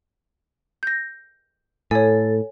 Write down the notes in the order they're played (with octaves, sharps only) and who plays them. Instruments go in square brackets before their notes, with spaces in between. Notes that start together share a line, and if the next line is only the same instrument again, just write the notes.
[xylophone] G6 A#6
[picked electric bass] A2 [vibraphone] A4 [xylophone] C#5 G#5